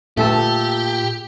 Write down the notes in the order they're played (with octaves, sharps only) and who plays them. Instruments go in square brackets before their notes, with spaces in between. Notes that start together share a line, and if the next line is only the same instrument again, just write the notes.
[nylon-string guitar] A#2 [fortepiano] A3 A4 A5 [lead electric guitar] G4